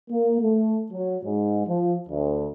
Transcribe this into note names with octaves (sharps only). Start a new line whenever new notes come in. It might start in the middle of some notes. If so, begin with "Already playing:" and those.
A#3
A3
F#3
G#2
F3
D2